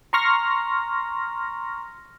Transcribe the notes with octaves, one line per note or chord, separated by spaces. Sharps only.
A#5 C6 C#6 F6 A#6